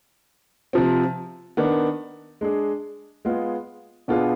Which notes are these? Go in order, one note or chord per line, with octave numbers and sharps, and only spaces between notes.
C3 F3 C4
D#3 B3 D4
G#3 D4 G#4
G#3 B3 F4 G#4
B2 B3 D4 F4 G#4